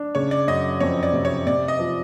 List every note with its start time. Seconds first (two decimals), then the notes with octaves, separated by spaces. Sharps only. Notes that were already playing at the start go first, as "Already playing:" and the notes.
Already playing: D4
0.15 C#3 C#5
0.31 D5
0.48 F#2 D#5
0.80 F2 C#5
1.03 D5
1.13 C3
1.25 C#5
1.47 C3 D5
1.68 D#5
1.79 F3